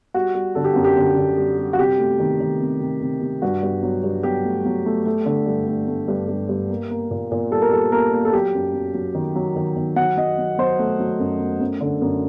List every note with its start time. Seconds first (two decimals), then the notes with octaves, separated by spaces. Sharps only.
0.14 G3 F#4
0.35 G3
0.55 D3 A4
0.64 G4
0.74 F#2 F#4
0.84 G4
0.97 D3
1.16 D3
1.37 G3
1.59 G3
1.73 F#4
1.79 C3 G4
1.99 A3
2.19 D#3
2.40 D#3
2.60 C3
2.81 C3
3.01 C3
3.21 C3
3.42 G2 F#4
3.63 G2
3.83 F#3
4.04 G2
4.23 F#3 G4
4.45 A3
4.66 F#3
4.86 A3
5.06 A3
5.26 D3
5.46 G2
5.67 A3
5.88 A3
6.08 G2
6.29 G2
6.49 G2
6.70 A#3
6.91 A#3
7.11 A#2
7.32 A#2
7.51 G3 A4
7.62 A#4
7.72 G3 A4
7.92 A#3 A#4
8.13 A#3
8.25 A4
8.33 F#3 G4
8.54 F#2
8.74 F#3
8.94 F#3
9.15 D#3
9.36 F#3
9.56 D#3
9.77 D#3
9.96 F#3 F#5
10.17 F#3 D#5
10.38 F#3
10.59 F#3 C5
10.79 A3
11.00 F#3
11.20 F#2
11.40 A3
11.60 F#2
11.81 D3
12.01 F#2